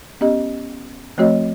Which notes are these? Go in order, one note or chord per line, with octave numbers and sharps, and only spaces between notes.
B3 C#4 G4 D#5
F3 A3 C4 F#4 C#5 D#5